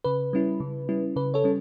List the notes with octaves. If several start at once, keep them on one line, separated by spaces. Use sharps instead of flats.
C#3 B4
G3 C#4 E4
C#3
G3 C#4 E4
C#3 B4
A4 C#5
G3 C#4